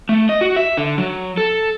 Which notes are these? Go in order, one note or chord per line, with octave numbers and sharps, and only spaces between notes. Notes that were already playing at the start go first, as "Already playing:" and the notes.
A3
D#5
F#4
E5
D3
F#3
A4